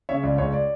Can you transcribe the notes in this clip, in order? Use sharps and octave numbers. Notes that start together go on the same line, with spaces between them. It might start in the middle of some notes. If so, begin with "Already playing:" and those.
C#3 C#5 E5
C#2 D5
C#2 C#5
D5